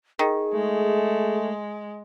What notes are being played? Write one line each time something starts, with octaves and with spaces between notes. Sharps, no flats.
D#3 G#4
G#3 A3